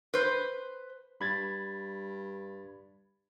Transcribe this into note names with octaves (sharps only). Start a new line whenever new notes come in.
B4 C5
G2 B5 G#6 A6